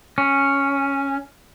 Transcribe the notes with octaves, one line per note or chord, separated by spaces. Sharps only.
C#4